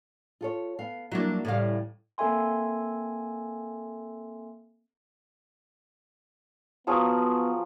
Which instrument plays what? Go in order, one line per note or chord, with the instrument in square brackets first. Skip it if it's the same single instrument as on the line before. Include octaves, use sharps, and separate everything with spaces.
[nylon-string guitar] F4 A4 C#5
B3 F5
[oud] F#3 D4 [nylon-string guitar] A#3 E4
[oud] A2 F5 [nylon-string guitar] C#3 E3 G3
[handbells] A#3 C4 A4 E5 G#5 C6
[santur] F3 F#3 G#4 [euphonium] B3